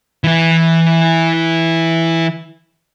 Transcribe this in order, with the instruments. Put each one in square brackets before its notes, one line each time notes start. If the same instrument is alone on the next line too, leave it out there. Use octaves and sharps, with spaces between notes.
[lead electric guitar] E3 E4